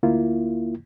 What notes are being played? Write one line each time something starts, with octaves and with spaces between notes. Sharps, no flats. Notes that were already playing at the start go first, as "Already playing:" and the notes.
D2 A#3 E4 F4